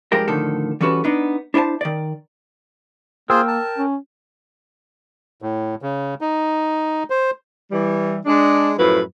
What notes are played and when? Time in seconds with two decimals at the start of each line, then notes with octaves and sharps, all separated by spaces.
0.12 G2 F3 G#3 G4 A#4
0.28 A2 D3 D#3 F3 A4
0.81 E3 G3 C#4 F#4 A4 B4
1.04 B3 D4 D#4
1.54 D4 E4 C5 G#5 A5
1.81 D#3 D5
3.30 A#3 F4 G#4 A#4 C5 G5 E6
3.48 A5
3.78 C#4
5.42 A2
5.82 C#3
6.21 D#4
7.10 C5
7.71 E3 G3
8.26 G#3 D4
8.78 F#2 A2 F3 E4 B4